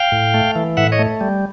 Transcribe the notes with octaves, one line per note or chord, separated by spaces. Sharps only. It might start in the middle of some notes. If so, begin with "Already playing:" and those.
Already playing: F5 G5
A2
A3
E3
A2 E5 F#5
C#5 D#5
A3
G3